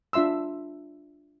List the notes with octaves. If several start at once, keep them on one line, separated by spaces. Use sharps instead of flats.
D4 F4 E5 C6 E6